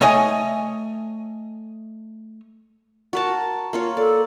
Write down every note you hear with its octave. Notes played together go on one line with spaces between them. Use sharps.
A3 C#5 D#5 G#5
F#4 A#4 A5
A#3 F4 C#5
A4 D5